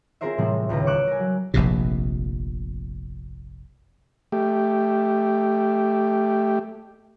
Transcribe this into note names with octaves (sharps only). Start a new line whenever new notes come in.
C4 F4 G#4 A#4 C5 E5
A2 C3 E3 G3 C4
D#1 C#2 B4 A#5
C#6 D6 E6 F#6
A#4 G#5
F#3
F1 A#1 F2 C3
A3 G4